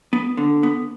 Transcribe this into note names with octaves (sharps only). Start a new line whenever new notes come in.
B3
D3
B3